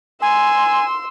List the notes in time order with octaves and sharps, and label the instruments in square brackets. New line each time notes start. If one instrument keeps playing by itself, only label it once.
[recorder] G#5 [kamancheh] C6 E6